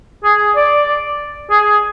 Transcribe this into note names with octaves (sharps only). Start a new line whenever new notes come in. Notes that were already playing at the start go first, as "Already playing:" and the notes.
G#4
D5
G#4